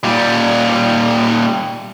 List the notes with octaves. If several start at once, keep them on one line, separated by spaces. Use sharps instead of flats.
A#2 G3